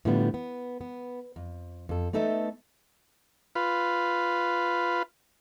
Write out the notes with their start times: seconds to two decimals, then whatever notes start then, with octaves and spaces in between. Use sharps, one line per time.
0.05 A2 D3 F3 G3 B3
0.34 B3
0.81 B3
1.36 F2
1.89 F2 A4
2.13 A3 B3 D#4 A4 E5
3.55 F4 B4